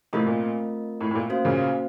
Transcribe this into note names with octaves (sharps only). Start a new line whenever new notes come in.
A2 C3 A3 C4 F4 A#4 D#5
A#2
A2
A2
A#2
A#3 C#4 F#4 C5 F5
A#2 C#3